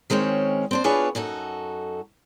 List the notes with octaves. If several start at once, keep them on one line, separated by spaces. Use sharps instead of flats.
D#3 G#3 C4 C#4 C#5
C4 D4 C5
B3 D4 F4 G#4 B4 C#5
F#2 D#4 F#4 A4